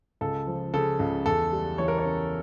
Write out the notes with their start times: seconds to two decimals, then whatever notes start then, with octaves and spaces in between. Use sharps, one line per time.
0.21 C#2 A4
0.47 F3
0.74 C#3 A4
0.99 C#2
1.26 E2 A4
1.52 G3
1.78 E3 C#5
1.88 A#4
1.98 C#5
2.05 C#4